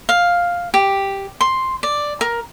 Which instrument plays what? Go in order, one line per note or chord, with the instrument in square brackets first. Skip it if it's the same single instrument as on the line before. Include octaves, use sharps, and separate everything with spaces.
[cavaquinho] F5
G4
C6
D5
A#4